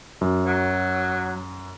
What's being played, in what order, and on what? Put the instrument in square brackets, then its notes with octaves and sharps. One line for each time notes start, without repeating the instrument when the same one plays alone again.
[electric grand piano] F#2
[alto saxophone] F#3